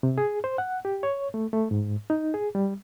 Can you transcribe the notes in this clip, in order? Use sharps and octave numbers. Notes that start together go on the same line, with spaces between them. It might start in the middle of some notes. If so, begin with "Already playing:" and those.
C3
G#4
C5
F#5
G4
C#5
A3
A3
G#2
D#4
G#4
G3